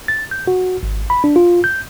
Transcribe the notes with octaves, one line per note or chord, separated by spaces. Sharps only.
A6
G6
F#4
G#1
B5
D4
F4
G6